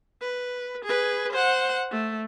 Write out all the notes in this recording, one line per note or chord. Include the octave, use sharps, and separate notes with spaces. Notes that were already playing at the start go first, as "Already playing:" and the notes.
B4
G#4 B4
C5 F#5
A3